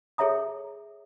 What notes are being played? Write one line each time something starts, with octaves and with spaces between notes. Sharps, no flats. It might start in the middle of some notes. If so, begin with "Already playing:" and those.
G#4 A4 C#5 E5 A#5 D#6